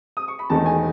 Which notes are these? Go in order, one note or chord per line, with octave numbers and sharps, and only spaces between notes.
D#6
C#6
B5
E1 E2 D#3 A3 D#4 A5
G#5